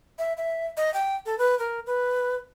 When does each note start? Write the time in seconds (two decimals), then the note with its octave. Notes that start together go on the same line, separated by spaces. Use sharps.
0.19 E5
0.37 E5
0.77 D#5
0.94 G5
1.26 A4
1.38 B4
1.59 A#4
1.86 B4